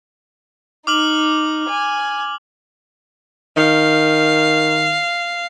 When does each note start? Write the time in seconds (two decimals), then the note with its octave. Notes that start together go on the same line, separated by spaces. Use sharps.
0.87 D#4 D6 F6 F#7
1.69 G#5
3.57 D#3 F5